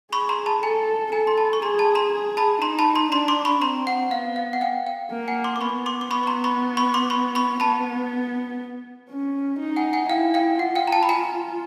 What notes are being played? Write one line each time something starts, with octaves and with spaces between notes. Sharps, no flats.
G#4 B5 C#6
A#5 C6
A5 B5
A4 G#5 A#5
A4 G#5 A#5
C6
A5 B5
C#6
G#4 A#5 C6
A5 B5
A#5 C6
G#4
A5 B5
D#4 A#5 C6
A5 B5
A#5 C6
D4 A#5 C6
C6 D6
B5 C#6
C4 A#5 C6
F#5
B3 F5
F5
F#5
F5 G5
F5 G5
A#3
F#5 G#5
C6 D6
D6
B3 B5 C#6
C6 D6
D6
B3 B5 C#6
C#6
A#5 C6
B5 C#6
B5 C#6
C6 D6
B5 C#6
B5 C#6
B3 A5 B5
C#4
D#4
F#5 G#5
F#5 G#5
E4 F5 G5
F5 G5
F4 F#5
F5 G5
A#5
G5 A5
B5
G#5 A#5